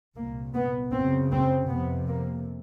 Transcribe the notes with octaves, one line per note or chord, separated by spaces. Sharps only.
C2 A#2 A#3
B3
F#2 C#3 C4
C4
F2 C3 B3
A#3